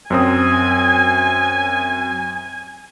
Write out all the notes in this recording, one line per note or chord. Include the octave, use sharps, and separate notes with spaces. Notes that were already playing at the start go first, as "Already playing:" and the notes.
F#2 C4 G#5 D#6